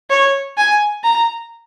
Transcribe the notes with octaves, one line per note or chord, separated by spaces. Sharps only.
C#5
G#5
A#5